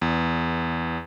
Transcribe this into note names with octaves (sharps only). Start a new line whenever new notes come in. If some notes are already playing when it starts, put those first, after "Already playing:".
E2